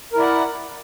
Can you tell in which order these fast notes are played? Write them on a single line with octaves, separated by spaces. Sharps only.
A#4 E4 D5 F#5